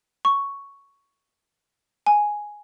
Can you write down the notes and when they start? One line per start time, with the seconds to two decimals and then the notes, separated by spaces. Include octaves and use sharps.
0.25 C#6
2.06 G#5